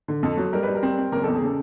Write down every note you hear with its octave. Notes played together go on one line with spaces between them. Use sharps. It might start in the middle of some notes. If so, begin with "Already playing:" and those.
D3
F2 A4
F#3
G3 A#4
G3 B4
A#4
C4
C4
F#1 A#4
E2 A4
G#4
C#3 A4